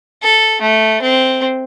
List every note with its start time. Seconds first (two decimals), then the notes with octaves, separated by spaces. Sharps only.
0.23 A4
0.62 A3
1.02 C4